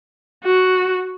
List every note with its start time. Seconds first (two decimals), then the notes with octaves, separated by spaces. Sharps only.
0.45 F#4